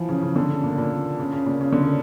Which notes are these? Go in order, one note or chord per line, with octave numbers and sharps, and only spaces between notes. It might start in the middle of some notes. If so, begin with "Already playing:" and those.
Already playing: E3 F3
C#3
C#3
D3
C#3
A#2
A#2
C#3
C#3
A#2
C#3
D3
C#3